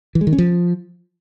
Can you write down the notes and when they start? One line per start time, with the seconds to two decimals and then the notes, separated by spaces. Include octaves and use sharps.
0.15 E3
0.21 G#3
0.27 D#3
0.33 C#4
0.38 F3